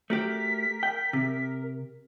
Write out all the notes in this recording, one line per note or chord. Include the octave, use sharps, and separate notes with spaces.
A3 F#4 G4 A#4 B6
G5
C3